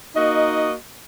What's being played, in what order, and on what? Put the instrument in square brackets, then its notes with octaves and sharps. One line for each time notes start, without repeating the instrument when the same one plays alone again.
[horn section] A#3 D#4 F#4 D#5